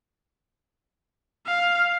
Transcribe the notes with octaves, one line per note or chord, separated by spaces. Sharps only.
F5